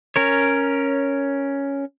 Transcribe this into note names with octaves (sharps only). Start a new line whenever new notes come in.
C#4 A#4 C#5